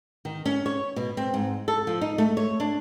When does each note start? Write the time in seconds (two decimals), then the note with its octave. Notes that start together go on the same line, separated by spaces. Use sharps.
0.25 D#3
0.46 C#4
0.66 C#5
0.96 B2
1.17 C4
1.34 G#2
1.68 A4
1.87 F3
2.01 D#4
2.18 A3
2.37 C#5
2.60 D4